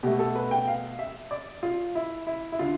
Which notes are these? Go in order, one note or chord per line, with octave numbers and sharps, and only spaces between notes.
B2 A3 G4
A4
B4
G5
F5
E5
D5
F4
E4
E4
E4
D3 F4